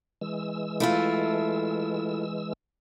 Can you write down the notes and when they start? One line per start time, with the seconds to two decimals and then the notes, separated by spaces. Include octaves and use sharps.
0.21 E3 G#3 E6
0.80 A3 E4 F4